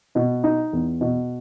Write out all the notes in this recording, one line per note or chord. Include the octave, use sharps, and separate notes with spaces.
B2
D#4
E2
B2